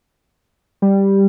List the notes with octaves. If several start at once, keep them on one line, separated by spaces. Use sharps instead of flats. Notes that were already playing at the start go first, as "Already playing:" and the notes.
G3